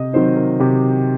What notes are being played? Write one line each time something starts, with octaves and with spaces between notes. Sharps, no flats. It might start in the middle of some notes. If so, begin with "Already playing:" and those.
Already playing: C3 D#5
D#3 F#3 C4 D#4 C5
A#4
C3 G4